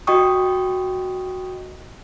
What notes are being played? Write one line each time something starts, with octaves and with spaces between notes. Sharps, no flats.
F#4 D#5 G5 C#6 D#6